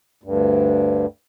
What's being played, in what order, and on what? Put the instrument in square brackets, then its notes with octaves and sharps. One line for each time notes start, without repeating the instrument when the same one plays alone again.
[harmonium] D2 G2